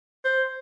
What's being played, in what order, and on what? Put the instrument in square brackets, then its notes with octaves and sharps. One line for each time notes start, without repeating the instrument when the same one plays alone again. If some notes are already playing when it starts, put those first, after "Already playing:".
[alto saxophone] C5